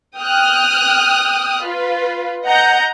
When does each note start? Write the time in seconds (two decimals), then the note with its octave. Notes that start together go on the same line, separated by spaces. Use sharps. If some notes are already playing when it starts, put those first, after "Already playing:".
0.18 G5 D#6 F6 F#6
1.64 F4 B4
2.46 D#5 F#5 A#5 G6